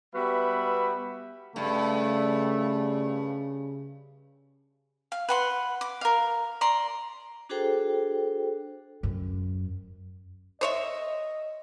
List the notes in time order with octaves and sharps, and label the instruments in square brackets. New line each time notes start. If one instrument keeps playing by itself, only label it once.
[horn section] G3 B3 F#4 B4 E5 B5
[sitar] G2 [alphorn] C#3 [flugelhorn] A3
[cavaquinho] F5
B4 F#5 C6
D6
A#4 F5
D5 A#5 C6
[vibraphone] D4 F#4 G#4 A4 C5 G5
[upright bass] F#2
[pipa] C5 C#5 E5 [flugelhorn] D#5